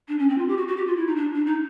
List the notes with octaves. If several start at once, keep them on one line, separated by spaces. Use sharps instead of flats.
D4
C#4
C4
F4
G4
F#4
F#4
G4
F4
E4
D#4
D4
D4
D#4